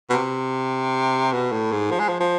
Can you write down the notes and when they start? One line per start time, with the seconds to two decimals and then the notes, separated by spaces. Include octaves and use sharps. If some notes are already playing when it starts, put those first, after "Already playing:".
0.10 B2
0.13 C3
1.32 B2
1.52 A2
1.72 G#2
1.91 F3
1.99 G#3
2.09 F3
2.20 F3